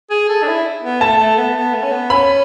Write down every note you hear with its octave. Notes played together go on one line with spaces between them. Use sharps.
G#4
A4
D4
E4
B3
A3 A5
A3
B3
B3
A3
C#4
B3
C#4 B5